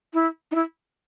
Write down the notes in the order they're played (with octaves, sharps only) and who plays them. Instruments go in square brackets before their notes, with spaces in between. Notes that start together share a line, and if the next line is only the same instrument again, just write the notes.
[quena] E4
D#4
E4